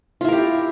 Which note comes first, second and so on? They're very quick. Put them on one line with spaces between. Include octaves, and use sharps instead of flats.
F4 E4 A#4 G4